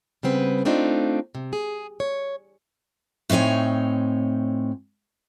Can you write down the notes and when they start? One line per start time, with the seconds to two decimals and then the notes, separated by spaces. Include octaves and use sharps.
0.23 C#3 G3 B3 C4 B4
0.65 A3 C4 D4 D#4 F4
1.35 C3
1.53 G#4
2.00 C#5
3.30 A2 C4 D#4 C#5 G#5